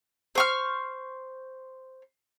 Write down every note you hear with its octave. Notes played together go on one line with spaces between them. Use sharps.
C5 C#6 F6